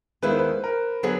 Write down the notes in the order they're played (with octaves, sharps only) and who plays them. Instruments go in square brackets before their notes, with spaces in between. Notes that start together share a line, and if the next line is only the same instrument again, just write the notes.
[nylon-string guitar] D#2 D#3 G#3 B3 E4 [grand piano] B4
[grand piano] C5
B4
A#4
[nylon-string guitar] D3 F#3 B3 [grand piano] G#4